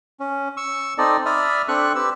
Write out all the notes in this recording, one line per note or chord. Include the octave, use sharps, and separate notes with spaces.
C#4
C#6 E6
C4 D#4 A4 D5 D#5
D5 E5 B5 D#6 F6
C4 D4 A4 C#6 F#6
G4 B4 E6